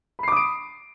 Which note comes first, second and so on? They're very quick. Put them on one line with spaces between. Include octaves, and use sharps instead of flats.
B5 C7 D6 D#6 D7